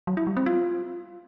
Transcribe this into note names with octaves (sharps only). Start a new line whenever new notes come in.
F#3
E4
G3
C4
F4